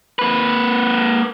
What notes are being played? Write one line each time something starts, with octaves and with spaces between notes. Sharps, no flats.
A#3 B4